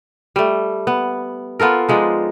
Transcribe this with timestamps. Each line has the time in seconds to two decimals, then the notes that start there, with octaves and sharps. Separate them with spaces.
0.36 G3 A3
0.87 B3
1.60 B3 F4 A4 A#4
1.89 F3 G#3 D4 D#4